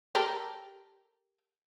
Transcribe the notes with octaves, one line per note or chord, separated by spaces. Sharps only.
G4 A4 A#4